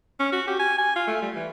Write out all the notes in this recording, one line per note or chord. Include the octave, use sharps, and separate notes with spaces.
C#4
F#4
G4
G#5
G#5
F4
A3
G3
E3